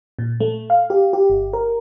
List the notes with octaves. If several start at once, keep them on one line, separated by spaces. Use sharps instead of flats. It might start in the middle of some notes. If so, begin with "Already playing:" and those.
A#2
A3
F5
G4
G4
G1
A#4